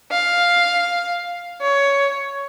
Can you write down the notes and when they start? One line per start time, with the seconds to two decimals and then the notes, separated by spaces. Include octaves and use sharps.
0.12 F5
1.61 C#5